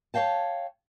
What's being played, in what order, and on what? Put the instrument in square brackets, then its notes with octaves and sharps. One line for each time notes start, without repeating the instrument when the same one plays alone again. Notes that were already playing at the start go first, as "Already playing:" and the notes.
[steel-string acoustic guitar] C#5 D#5 F5 G5 A5